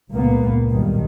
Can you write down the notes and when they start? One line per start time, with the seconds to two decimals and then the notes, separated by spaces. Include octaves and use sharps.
0.11 C#2 A#2 A#3 B3
0.71 B1 G2 D#3